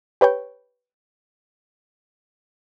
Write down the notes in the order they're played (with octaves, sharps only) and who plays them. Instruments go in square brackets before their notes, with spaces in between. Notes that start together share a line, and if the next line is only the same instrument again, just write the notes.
[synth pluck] G4 B4 C#5 G5